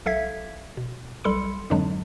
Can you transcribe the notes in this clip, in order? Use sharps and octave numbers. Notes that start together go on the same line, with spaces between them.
B1 A4 E5 F5 G#6 B6
B2
B1 G3 A4 B5 C6 C#7
F2 G#2 D3 F#3 G#3 D4